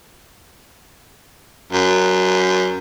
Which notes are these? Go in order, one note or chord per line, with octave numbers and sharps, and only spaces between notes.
F#2